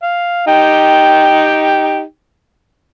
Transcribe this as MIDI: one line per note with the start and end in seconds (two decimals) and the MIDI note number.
0.03 0.46 77
0.48 2.02 63
0.48 2.02 67
0.48 2.02 79